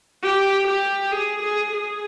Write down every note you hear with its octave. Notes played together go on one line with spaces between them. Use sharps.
G4
G4
G#4
G#4
G#4